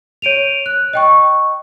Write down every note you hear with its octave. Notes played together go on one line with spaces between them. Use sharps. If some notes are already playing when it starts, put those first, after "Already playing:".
C#5 D7 D#7 F7
F#6
D#5 G5 C#6